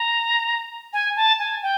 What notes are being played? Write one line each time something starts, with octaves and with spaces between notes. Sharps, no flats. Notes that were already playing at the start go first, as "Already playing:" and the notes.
Already playing: A#5
G#5
A5
G#5
G5